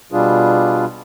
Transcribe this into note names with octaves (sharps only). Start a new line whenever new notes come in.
B2 G3 D4 F4 G#4